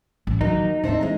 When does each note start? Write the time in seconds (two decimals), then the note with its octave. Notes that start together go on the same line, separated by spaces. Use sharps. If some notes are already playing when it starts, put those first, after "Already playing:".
0.27 A1
0.41 D#3 F3 F#3 A#3 D#4
0.84 A2 C4 D4 C5 E5
1.01 E3 G#3